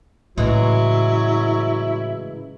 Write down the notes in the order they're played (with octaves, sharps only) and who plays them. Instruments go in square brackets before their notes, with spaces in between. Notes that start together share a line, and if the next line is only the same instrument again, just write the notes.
[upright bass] A2 [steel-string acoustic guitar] C#3 E3 G#3 [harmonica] F#3 [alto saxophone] E4